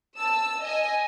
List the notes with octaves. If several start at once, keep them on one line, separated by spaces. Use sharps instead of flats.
A5 E6
D#5 G#5